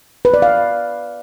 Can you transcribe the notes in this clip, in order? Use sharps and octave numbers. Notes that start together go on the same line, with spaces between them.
B4
D5
F5